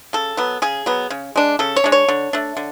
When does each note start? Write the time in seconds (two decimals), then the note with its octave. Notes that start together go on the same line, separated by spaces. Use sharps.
0.13 C#3 A4
0.37 F#3 B3
0.62 C#3 G#4
0.86 F#3 B3
1.10 C#3
1.36 G#3 D4
1.59 C#3 A4
1.76 C#5
1.84 G#3 D4
1.92 C#5
2.08 D3
2.33 A3 D4
2.57 D3